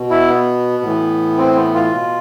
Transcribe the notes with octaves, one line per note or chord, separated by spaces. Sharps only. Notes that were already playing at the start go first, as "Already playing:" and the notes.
Already playing: B2
E4
B3
A2 E3
C4
B3
F4
B2